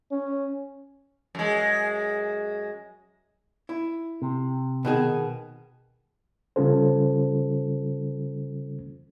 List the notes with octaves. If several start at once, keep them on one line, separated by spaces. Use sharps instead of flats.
C#4
F#2 G#3
E4
C3
B2 D#3 G#4
C#3 G3 C#4 F4 A4 C5